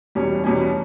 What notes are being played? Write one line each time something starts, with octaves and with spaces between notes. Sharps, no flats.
E2 B2 G3 C#4
E2 B2 G3 C#4